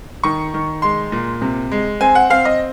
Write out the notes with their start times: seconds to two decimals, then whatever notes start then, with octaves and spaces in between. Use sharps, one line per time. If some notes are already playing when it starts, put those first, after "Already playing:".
0.23 D#3 C#6
0.54 D#3
0.82 G#3 C6
1.12 A#2
1.41 C3
1.71 G#3
2.01 C4 G#5
2.15 F#5
2.30 C4 F5
2.45 D#5